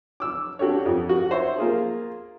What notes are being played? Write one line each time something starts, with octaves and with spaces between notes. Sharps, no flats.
D6 E6
D4 F#4 G4 A4 C#5
F2
F#4
C5 C#5 E5
A#3 F4 G#4